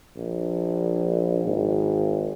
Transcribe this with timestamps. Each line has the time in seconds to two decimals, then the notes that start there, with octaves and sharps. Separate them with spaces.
0.16 A#1
1.45 G#1